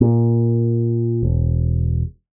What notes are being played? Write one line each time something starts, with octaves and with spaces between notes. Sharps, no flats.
A#2
E1